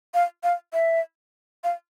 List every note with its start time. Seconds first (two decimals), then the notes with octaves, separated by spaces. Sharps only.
0.14 F5
0.43 F5
0.73 E5
1.64 F5